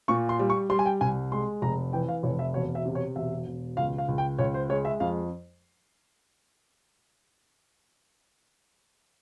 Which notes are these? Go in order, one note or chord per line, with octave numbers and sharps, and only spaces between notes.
A#2 C#6
C6
G3
C#6
G3 C6
G#5
G5
C2 G#5
G#3 C6
F1 A#5
E3 G5
F5
F1 C#5
E5
E1 C#5
E5
C3
C#5
E1 E5
E1
C#2 F5
F5
C#2
G5
C#2 C#5
C5
G#3 C#5
E5
F2 F5